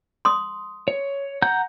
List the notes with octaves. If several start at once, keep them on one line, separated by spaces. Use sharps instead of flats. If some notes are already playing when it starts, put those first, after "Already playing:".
C6 D#6
C#5
F#5 A#5 G6